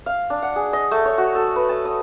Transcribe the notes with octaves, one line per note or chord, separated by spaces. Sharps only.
F5
D4
F#5
G#4
D#5
A3
C#5
F#4
A4
B4
A5
D#6